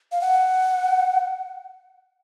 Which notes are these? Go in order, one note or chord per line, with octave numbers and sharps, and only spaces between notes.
F5
F#5